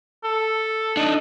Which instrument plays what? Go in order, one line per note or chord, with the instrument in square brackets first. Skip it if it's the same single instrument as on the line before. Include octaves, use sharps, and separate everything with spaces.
[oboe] A4
[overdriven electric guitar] D4 D#4